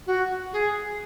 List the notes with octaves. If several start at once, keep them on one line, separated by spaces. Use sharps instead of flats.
F#4
G#4